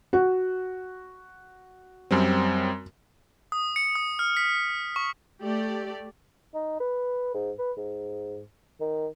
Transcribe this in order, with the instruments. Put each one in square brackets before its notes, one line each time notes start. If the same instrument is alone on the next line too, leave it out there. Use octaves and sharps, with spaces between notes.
[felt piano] F#4
[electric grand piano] F#2 G3 C4
[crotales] D#6
C#7
D#6
F6
B6
C#6
[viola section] A3 G4 D5
[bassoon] D#4
B4
G#2
B4
G#2
D#3